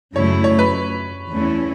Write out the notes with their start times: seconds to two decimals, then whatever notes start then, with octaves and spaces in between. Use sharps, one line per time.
0.15 F#2 C#3 A3 E4 C#5
0.44 C#5
0.59 B4
1.30 E2 E3 A3 C#4 E4